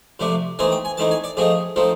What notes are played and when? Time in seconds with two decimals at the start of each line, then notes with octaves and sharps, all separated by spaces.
0.20 C3 F3 A3 D4
0.59 E3 A3 C4 D#4 G#5
0.72 G5
0.85 G#5
0.97 E3 A3 C4 D#4 A5
1.11 G#5
1.24 D5
1.37 F3 A3 C4 D#4 G#4
1.76 F3 A3 C4 D#4